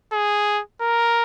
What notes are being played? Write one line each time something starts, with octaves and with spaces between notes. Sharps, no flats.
G#4
A#4